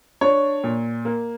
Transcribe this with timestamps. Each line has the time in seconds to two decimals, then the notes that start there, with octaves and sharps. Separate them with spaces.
0.21 D4 C#5
0.64 A#2
1.05 A#3